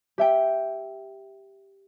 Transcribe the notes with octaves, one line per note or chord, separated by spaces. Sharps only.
G4 E5 G5